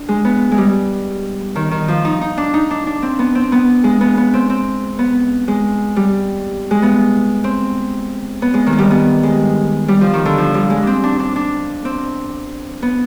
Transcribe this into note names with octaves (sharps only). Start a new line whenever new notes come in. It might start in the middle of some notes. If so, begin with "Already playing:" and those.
Already playing: D4
G#3
B3
G#3
G3
D#3
D#3
F3
D#4
D#4
D4
D#4
D4
D4
C4
B3
C4
B3
G#3
B3
B3
C4
C4
B3
G#3
G3
G#3
B3
C4
B3
G#3
D#3
G#3
G3
B3
G#3
G3
F3
D#3
D3
F3
G3
G#3
C4 D4
D4
D4
D4
C4
B3